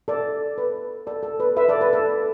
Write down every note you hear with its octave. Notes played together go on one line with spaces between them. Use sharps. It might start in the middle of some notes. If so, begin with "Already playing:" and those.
A4 D5
B4
A4 D5
A4
B4
B4 E5
A4 D5
B4
A4